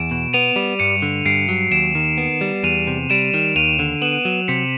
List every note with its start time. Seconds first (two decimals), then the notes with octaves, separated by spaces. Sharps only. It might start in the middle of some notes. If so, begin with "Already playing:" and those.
Already playing: E2 D7 E7
0.11 B2
0.33 B3 D#7 F7
0.56 G3
0.79 G2 C#7 D#7
1.02 D3
1.25 G2 C7 D7
1.49 F#3
1.71 D#2 D7 E7
1.95 D#3
2.18 B3
2.41 G3
2.63 E2 D#7 F7
2.87 C3
3.10 G3 D7 E7
3.34 D#3
3.56 D#2 D#7 F7
3.79 D3
4.02 B3 E7 F#7
4.25 F#3
4.48 C3 B6 C#7